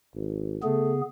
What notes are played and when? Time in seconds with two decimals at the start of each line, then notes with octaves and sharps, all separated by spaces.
0.15 G#1
0.63 C#3 A3 B3 G#4